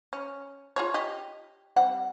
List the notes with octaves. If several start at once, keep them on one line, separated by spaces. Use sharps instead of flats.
C#4
F4 G#4 C#5
G4 D#5
G3 C4 F#5